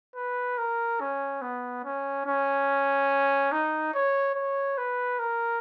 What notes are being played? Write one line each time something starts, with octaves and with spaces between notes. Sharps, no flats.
B4
A#4
C#4
B3
C#4
C#4
D#4
C#5
C#5
B4
A#4